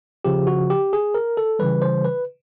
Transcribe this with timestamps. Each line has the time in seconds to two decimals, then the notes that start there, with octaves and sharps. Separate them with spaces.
0.25 C#3 F3 G4
0.47 F#4
0.70 G4
0.93 G#4
1.14 A#4
1.37 A4
1.59 C#3 E3 G3 B4
1.82 C5
2.05 B4